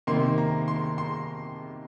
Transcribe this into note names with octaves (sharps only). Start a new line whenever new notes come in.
C3 D#3 A#3 C6
A#5
C6
C6